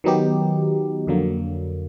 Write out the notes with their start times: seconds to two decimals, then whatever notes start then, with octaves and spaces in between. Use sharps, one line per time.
0.04 D#3 F#3 B3 D#4 G4
1.07 F2 D3 F#3 A#3